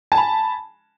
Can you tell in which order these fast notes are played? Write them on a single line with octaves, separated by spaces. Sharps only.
A5 G#5 B5